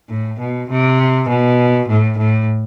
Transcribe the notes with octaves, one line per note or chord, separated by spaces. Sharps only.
A2
B2
C3
B2
A2
A2